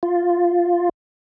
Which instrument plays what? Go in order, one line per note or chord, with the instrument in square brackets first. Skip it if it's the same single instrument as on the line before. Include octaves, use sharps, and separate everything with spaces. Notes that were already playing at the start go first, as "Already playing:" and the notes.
[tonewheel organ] F4